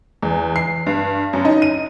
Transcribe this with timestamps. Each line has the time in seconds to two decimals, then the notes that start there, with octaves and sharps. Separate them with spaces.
0.22 E2
0.56 C7
0.86 G2
1.33 F#2
1.45 D#4
1.62 D#7